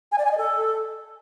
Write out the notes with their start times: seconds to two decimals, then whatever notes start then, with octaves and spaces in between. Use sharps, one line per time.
0.12 G#5
0.18 D5
0.25 G#5
0.31 D#5
0.38 A4